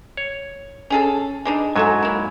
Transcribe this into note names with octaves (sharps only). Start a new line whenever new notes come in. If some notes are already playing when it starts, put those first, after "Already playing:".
C#5
C#4 G#4 A4
G#3 D4 D#4
G#2 F#3 E4 A4 G#5
A#3 E4